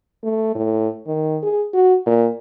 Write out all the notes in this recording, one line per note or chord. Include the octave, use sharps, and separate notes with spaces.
A3
A2
D#3
G#4
F#4
A#2